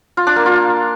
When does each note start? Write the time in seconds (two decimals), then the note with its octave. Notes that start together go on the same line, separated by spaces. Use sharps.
0.17 F4
0.27 D4
0.36 A#3
0.46 F4